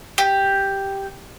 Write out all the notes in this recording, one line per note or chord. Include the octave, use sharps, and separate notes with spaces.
G4